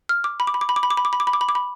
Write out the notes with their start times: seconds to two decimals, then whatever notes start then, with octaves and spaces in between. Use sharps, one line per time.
0.09 F6
0.24 D6
0.40 B5
0.47 D6
0.54 B5
0.61 D6
0.69 B5
0.76 D6
0.83 B5
0.90 D6
0.97 B5
1.05 D6
1.13 B5
1.20 D6
1.27 B5
1.33 D6
1.41 B5
1.49 D6
1.55 B5